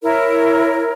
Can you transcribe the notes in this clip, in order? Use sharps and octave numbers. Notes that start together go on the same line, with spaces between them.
E4 A#4 C#5